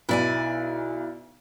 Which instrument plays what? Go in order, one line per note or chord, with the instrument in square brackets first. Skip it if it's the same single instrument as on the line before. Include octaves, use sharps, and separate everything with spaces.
[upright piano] B1 [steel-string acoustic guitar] E4 D5 G#5